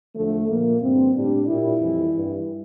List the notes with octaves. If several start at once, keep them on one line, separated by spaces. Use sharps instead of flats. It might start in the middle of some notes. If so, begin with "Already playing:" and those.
E2 D3 F3 A3
A#2 F3 A#3
G2 D3 G3 C4
A2 G3 D4
A#2 G3 E4
F2 E3 G3
G2 E3 G3